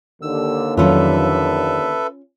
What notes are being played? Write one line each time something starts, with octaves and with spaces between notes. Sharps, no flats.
D#2 D3 E6
F2 D#3 F#3 C#4 F4 A4 B4 E5